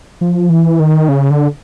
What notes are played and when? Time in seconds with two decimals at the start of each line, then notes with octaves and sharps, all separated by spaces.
0.21 F3
0.50 E3
0.80 D#3
1.09 C#3
1.30 D3